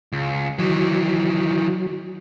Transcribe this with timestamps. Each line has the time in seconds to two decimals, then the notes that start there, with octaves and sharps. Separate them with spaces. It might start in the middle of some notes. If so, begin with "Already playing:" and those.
0.13 C#2
0.59 D#3 E3 F#3